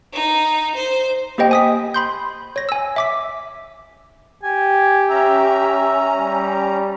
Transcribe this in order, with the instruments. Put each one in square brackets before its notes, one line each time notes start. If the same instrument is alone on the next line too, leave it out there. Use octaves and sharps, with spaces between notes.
[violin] D#4
C5
[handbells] A#3 G4 C5 D#5 G5
G#5 D#6 B6
B5 C6 G6
C#5 A#6
G#5 E6
E5 D6 B6
[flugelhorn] G4 [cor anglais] G#5
[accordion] C#4 A#5 [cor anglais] E5
[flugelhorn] G3